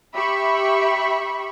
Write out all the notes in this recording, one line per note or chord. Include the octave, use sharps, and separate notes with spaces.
G4 E5 B5 C#6